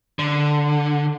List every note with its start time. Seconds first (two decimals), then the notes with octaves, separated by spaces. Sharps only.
0.19 D3